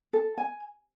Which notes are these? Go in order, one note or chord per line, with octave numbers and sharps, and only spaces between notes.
A4
G#5